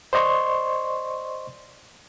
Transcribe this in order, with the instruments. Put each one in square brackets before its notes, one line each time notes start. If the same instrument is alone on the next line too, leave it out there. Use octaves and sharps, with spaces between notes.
[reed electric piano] C5 D5 D#5 C6 C#6